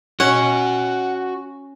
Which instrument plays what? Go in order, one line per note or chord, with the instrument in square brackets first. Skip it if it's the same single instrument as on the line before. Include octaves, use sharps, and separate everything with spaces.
[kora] C#4 [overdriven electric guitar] F#4 D#5 [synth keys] F#5